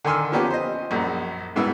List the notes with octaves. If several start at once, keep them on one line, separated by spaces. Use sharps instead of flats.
D3 D#3 G#5 C6 E6 F6
F3 A#3 B3 C#4 G4
C5 D#5
A#1 F#2
C2 G#2 B3 E4